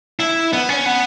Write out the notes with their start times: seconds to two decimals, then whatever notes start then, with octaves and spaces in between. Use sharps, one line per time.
0.20 E4
0.53 B3
0.69 C#4
0.86 B3